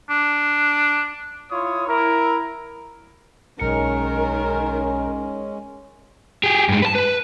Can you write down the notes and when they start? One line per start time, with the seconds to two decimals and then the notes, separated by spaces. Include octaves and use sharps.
0.10 D4
1.50 E4 F4 C#5 D#6
1.87 E4 A#4
3.59 B1 D#3 G#3 C#4 A#4 C#7
6.44 G4 G#4
6.69 G2 G#3
6.82 B4 A5
6.95 B4